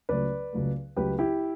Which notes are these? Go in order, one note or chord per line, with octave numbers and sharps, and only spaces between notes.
C#2 C#3 F#3 A3 B4 D5
C#2 C#3 F#3 A3
C#2 C#3 F#3 A3 G4 B4
E4 G4